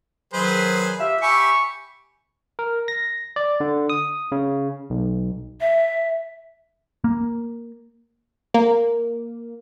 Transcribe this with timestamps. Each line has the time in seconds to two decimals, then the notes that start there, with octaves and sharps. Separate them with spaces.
0.34 G#2 D#3 F#3 G#4 B4 C5
0.99 F4 G4 E5
1.21 G4 E5 G#5 B5 C#6
2.59 A#4
2.88 A#6
3.36 D5
3.60 D3
3.90 D#6
4.32 C#3
4.90 B1
5.61 E5
7.04 A#3
8.54 A#3